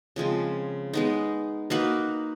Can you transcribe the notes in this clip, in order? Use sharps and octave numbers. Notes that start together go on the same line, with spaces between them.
C#3 F3 G#3 C4
G#3 B3 D#4
A#3 D#4 F#4 B4